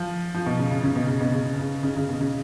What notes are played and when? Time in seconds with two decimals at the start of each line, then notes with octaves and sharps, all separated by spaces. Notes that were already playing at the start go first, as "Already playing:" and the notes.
Already playing: F3
0.34 F3
0.46 B2
0.59 C#3
0.71 C#3
0.84 C#3
0.96 B2
1.08 C#3
1.21 B2
1.33 C#3
1.59 C#3
1.83 C#3
1.97 C#3
2.09 B2
2.21 C#3